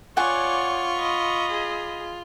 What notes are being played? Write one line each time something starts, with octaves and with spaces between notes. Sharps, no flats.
F4 C#5 D5 F#5 G#5 C#6
D#5 B5
G#4